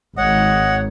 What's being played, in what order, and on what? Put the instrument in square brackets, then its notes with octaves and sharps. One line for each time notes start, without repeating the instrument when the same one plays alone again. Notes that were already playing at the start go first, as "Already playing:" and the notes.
[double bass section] G#1 [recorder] C#5 [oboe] D#5 [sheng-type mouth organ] F#5